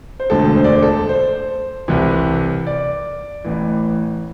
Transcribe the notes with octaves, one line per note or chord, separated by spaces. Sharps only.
C5
E1 D2 D3 A4
C5
D5
C5
A4
C5
C2 C3 E3
D5
A1 A2 E3